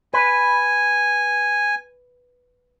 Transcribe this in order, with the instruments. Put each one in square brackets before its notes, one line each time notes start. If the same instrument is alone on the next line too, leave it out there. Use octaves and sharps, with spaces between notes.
[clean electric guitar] B4 [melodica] G#5